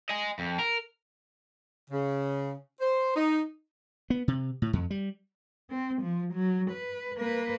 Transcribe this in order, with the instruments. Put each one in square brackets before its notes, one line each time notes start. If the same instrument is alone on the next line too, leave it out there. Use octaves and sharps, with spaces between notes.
[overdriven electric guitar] D#5 G#5
F2
A#4
[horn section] C#3
C5
D#4
[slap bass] B3
C3
A2
F2
G3
[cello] C4
F3
F#3
B4
A#3 B4